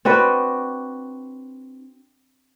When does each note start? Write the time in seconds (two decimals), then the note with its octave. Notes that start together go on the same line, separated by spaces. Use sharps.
0.05 C4 D4 F#4 B4